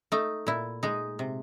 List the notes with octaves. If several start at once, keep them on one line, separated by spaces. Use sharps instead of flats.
A3 D#4
A#2 E4
G#3 D#4
C3